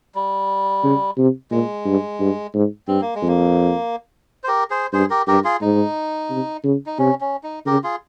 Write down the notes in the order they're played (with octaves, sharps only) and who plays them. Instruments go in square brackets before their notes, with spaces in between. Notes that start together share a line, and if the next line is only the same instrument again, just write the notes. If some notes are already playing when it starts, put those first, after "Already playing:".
[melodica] G3
[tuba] C#3
C3
[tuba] A#2 [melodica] G#3
[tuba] G2
G2
G#2
[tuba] G2 [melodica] C4
[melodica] A#3
G#3
[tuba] F2
[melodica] A#3
C5
G4 A#4
G#4 C5
[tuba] G2 [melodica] G#4 C5
[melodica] G4 A#4
[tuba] G2 [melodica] G4 A#4
[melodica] F4 G#4
[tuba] G#2 [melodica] D#4
[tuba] C3
C#3
[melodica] D#4
[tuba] C3 [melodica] C#4
[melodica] C#4
D#4
[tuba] C#3 [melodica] G4 A#4
[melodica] F4 G#4